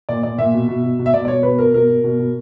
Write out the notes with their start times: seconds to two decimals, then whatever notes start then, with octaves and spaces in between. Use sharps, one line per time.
0.09 A#2 D5
0.23 A#2 D5
0.38 A#2 E5
0.54 B2
0.68 B2
0.83 B2
0.99 B2
1.06 E5
1.14 B2 D5
1.25 D5
1.28 B2 C#5
1.43 B2 B4
1.59 B2 A#4
1.73 B2 A#4
1.89 B2
2.04 B2
2.19 B2